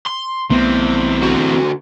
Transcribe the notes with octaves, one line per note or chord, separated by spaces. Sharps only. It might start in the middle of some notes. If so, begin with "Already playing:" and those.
C6
B1 E3 A3 B3 C4
D3 F#4